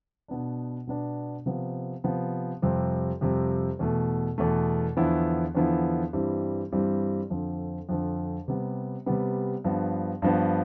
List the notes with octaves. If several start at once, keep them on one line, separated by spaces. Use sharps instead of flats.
B2 B3 D4
B2 B3 D4
C3 F3 B3
C3 F3 B3
F2 C3 G3 C4
F2 C3 G3 C4
E2 B2 A3
E2 B2 A3
E2 D3 F3 B3 E4
E2 D3 F3 B3 E4
G2 E3 G3 C4
G2 E3 G3 C4
F2 D3 F3 C4
F2 D3 F3 C4
C3 G3 B3
C3 G3 B3
G2 F3 B3
G2 F3 B3